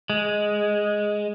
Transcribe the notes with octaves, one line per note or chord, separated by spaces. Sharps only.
G#3